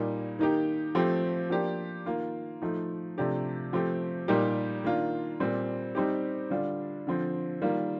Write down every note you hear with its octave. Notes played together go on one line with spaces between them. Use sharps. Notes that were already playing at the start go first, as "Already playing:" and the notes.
Already playing: A#2 G3 A#3 D#4
D#3 A#3 D#4 G4
F3 A3 C4 G4
F3 A#3 D4 G4
D#3 A#3 F4
F3 A3 D#4
C3 F3 A3 D4 G4
F3 A3 C4 G4
A#2 G3 A#3 D#4 G4
D#3 A#3 D4 F4
A#2 G3 C4
G3 C4 D#4 G4
D3 G3 D4 F4
D3 F3 C4
D#3 G3 A#3 F4